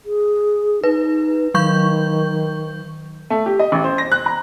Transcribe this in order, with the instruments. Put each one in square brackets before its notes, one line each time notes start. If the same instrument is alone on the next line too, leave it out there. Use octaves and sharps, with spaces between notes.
[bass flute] G#4
[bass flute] D#4 [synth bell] B4
[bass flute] D#3 [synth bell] F#3 C#6 G6
[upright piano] A3
G4
D#5
A1
C5
A#6
F#6
A#5